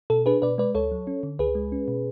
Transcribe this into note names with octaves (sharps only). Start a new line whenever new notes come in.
B2 A4
D4 G#4 B4
B2 B4 D5
G#3 B4 D5
D2 A4 C#5
F#3
C#4
D3
C#2 G#4 B4
G#3
C#4
B2